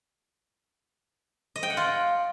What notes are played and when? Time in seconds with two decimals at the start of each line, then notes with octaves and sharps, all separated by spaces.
1.56 D#5
1.63 G5
1.70 F#5
1.77 F4